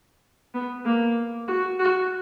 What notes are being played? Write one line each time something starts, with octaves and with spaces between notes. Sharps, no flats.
B3
A#3
F#4
F#4